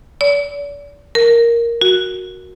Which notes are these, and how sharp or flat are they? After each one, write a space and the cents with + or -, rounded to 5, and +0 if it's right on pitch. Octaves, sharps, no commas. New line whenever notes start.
D5 -40
A#4 +0
F#4 -5